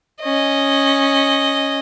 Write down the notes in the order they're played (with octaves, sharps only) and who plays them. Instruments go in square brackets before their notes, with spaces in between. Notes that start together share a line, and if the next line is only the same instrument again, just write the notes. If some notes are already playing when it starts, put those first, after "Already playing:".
[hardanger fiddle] C#4 D#5